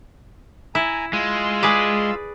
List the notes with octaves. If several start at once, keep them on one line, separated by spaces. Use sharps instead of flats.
E4 G#5 A#5
G#3 F4 F5 E6
G#4 B4 D5